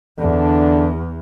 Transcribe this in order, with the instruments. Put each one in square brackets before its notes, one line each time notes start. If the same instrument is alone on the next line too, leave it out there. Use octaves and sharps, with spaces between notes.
[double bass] E2 [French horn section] D3 D4